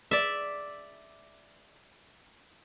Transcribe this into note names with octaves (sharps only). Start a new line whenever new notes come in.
D5 E5